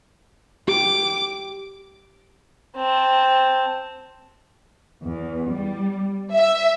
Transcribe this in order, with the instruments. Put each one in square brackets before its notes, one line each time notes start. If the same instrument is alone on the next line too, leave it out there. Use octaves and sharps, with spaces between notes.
[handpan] G4 [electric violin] D6
[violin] C4 A5
[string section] E2
G3
E5